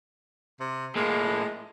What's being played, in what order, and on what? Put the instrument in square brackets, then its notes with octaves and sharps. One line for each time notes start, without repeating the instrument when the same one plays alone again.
[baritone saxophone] C3
[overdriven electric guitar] A2 A#3 [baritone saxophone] G#3